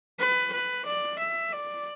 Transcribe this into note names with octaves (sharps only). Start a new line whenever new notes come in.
B4
B4
D5
E5
D5